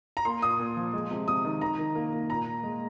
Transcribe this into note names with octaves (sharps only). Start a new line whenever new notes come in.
A#5
A#3 C6
A#2 D#6
A#2
F3
G#3
C3
C3 D#6
D#3
D#3 A#5
D#3
A#3
A#3
A#2 A#5
A#2
G#3